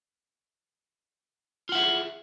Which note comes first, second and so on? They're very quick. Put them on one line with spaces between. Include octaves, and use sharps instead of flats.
F4 F#5 E5 G#4